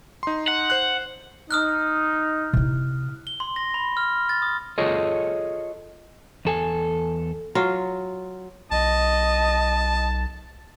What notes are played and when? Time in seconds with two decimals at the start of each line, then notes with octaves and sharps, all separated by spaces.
0.23 D#4 C6
0.48 F#5
0.70 C5 F#6
1.51 D#4 D#6 F6 F#6
2.53 C3 E4
3.27 G7
3.40 C6
3.56 A#6
3.74 B5
3.97 F6
4.29 A6
4.42 D#6
4.78 F4 G#4 A4 C#5 D#5
6.45 E2 A4 G#5
7.55 F#3 F4
8.71 B1 D#5 A5